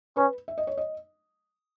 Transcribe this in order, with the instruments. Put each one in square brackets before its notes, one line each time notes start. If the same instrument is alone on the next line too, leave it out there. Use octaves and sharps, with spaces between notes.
[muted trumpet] C#4 [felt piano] B4
[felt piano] E5
D#5
C#5
D#5